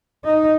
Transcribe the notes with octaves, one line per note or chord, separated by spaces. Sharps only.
D#4